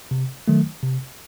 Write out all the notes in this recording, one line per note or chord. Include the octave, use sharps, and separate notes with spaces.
C3
D#3 F#3 A3
C3